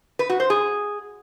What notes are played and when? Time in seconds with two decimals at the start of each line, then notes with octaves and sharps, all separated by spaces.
0.19 B4
0.30 F#4
0.40 C5
0.50 G#4